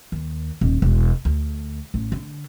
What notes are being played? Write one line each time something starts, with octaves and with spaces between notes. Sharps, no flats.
D#2
D#1
E1
D2
A1
D3